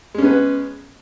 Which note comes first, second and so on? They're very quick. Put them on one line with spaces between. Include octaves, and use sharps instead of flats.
G#3 C#4 B3 B4